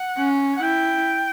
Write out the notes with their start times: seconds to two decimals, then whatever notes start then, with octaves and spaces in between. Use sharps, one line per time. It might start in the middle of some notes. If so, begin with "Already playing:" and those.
Already playing: F#5
0.18 C#4
0.57 F#5
0.62 E4 G5